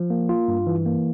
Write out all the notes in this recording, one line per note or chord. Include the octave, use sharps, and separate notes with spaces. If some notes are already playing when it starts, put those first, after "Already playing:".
Already playing: F3
A#3
F4
G2
E3
A#3